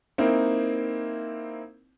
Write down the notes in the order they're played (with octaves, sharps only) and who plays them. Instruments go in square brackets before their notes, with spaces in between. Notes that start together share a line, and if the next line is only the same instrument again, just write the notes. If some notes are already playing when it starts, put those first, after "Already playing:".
[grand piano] A#3 C4 D#4 E4